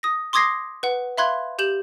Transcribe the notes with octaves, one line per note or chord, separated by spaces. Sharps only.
D#6 A#6
C6 D6 D#6 G#6 A#6 C7
B4 F#5
E5 F5 B5 C6 F#6 G#6
G4 G6 E7 F#7